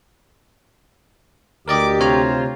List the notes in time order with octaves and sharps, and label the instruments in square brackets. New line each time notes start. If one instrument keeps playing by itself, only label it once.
[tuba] D2 [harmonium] G4 [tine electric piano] A#4 D5 D#5 [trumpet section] D6
[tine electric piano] C3 C#5 A#5 [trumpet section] F4 C5